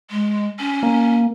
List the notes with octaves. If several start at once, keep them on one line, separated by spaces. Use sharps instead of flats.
G#3
C#4
A#3